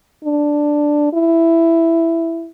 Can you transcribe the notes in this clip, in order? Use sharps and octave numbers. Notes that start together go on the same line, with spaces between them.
D4
E4